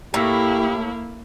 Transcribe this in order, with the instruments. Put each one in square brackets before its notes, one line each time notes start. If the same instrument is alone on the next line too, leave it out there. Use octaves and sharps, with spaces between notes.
[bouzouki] A2 [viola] A#3 E4 [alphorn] G4